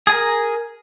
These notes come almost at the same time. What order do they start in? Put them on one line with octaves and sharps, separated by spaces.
G#4 G#5 A#4